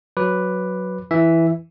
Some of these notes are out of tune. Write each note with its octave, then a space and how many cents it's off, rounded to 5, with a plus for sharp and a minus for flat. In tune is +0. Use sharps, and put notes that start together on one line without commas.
F#3 +0 B4 +0 D6 +0
E3 +0 E5 +0